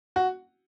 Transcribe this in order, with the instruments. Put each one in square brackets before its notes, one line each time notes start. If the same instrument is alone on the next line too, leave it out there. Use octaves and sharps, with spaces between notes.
[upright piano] F#4